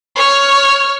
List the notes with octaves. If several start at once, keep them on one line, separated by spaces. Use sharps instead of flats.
C#5 F6